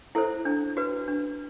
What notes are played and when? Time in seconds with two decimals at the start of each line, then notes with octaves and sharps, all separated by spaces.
0.15 E4 A4 C5
0.45 D4
0.77 F#4 B4
1.08 D4